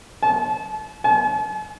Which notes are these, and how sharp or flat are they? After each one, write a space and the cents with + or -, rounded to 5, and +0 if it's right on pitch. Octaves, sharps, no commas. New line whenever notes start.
A5 -30
A5 -45